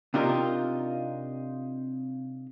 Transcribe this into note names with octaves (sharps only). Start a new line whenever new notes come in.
C3 D4 D#4 F4 G4 A#4